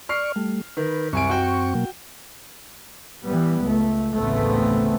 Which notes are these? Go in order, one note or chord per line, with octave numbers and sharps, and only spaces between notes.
D5 C#6 F6 C7
G3 A3
D#3 B4
C2 F#2 C4 G#5 C#6 D7
F#4 G5
B2 F#3 A#3
E3 G3 B3
C#2 A3
A1 D2 C#3 A3 B3 C4